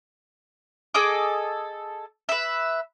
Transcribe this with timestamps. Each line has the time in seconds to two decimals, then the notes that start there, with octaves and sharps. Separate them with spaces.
0.94 G#4 A4 D#5 D6
2.29 B4 E5